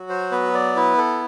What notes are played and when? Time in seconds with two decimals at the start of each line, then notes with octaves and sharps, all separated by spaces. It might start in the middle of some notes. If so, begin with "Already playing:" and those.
Already playing: F#3 F#4
0.09 C5
0.31 B3 B4
0.54 D5
0.76 E4 B4
0.98 A4